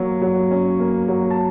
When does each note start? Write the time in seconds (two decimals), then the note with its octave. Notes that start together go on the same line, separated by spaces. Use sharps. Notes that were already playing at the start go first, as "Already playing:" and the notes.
Already playing: F#3 A#3
0.22 F#3
0.51 C#4
0.80 A#3
1.08 F#3
1.30 A5